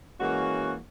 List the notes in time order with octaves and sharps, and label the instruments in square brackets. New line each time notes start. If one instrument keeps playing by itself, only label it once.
[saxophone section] E3 G#3 A#3 [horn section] C#4 F#4